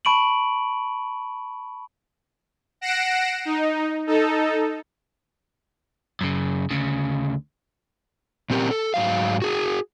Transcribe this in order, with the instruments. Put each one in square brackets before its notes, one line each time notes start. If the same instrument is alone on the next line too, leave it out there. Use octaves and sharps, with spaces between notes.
[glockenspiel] A5 B5 C#6 D7 D#7 F#7
[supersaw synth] F#5 A#6 C7 D7 E7
D#4
D#4 A4
[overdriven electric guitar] F#2 C#3
D2 C#3
[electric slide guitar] A#2 C4 G4 A#4
A4
G#2 F#3 F5
F#4 G#4